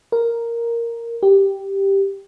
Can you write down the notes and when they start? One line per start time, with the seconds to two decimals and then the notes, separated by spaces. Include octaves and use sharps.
0.12 A#4
1.23 G4